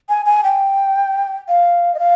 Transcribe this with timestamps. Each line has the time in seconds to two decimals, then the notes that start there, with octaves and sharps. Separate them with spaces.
0.09 G#5
0.26 G#5
0.44 G5
1.48 F5
1.95 D#5
1.99 F5